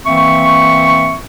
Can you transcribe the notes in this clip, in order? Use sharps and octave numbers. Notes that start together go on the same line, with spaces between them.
E3 A#3 C4 E5 C#6